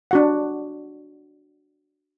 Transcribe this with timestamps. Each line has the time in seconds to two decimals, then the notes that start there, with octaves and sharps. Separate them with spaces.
0.11 D4 F#4 F#5